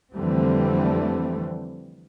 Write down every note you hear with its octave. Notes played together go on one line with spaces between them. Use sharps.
F2 D3 E3 G3 A3 C4